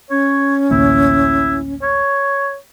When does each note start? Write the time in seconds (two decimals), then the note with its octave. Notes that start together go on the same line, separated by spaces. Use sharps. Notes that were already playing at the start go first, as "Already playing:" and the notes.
0.10 C#4 C#5
0.71 A1 D2 A#3 E4
1.82 C#5